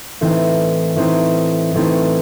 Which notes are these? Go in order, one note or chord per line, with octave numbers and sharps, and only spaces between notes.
A2 E3 A3 C4 D#4
A2 E3 A3 C4 D#4
A2 E3 A3 C4 D#4